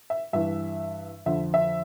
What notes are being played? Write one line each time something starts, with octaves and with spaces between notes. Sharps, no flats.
E5
G2 E3 E5
F2 D3 F3 E5
E5